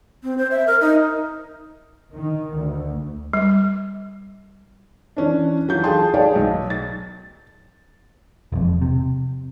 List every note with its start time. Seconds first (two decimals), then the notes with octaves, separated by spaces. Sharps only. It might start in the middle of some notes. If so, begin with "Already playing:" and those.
0.23 C4
0.38 C5
0.51 E5
0.67 A#4
0.81 D#4
2.14 D#3
2.55 D2
3.33 G3
5.17 E3 C#4 D4
5.68 E3 F#3 F4 G6
5.84 G#4 A4 F5 G5 A5 C6
6.14 G#4 C#5 D5 F5 G5 A5
6.35 B1
6.70 A6
8.52 E1 F2
8.82 C3